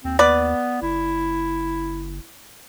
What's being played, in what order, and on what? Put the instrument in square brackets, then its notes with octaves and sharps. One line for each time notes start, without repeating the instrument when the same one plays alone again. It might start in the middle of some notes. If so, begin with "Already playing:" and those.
[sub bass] D#2 [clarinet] C4
[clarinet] B3 [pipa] B4 D5
[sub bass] F#1 [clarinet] E4